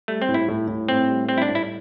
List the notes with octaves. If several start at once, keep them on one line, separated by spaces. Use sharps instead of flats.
G3 A3
C4
A2
E4
A2
A2
A2 C4
G3
G3 C4
E4
D4
A2
E4